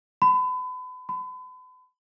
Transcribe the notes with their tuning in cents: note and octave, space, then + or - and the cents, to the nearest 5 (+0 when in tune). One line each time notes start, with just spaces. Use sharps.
B5 +35
B5 +40